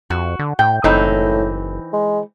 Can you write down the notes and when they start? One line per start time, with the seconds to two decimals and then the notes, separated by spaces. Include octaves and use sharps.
0.10 F2 F#4
0.39 D3
0.59 A2 G5
0.84 F#1 A2 E3 C4 D#4
1.93 G#3